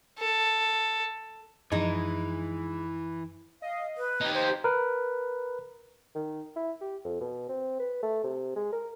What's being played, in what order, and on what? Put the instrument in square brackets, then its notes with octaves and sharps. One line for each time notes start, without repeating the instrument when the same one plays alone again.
[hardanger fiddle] A4
[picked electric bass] F#2 F3 [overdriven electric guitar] E3 [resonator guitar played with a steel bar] G#3 D#4
[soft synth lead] D#5 [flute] F5
[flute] B4
[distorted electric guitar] D#4 G4
[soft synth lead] C5 [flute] G6
[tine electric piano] A#4 B4
[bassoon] D#3
E4
G4
F2
B2
C4
B4
A3
C3
G#3
A#4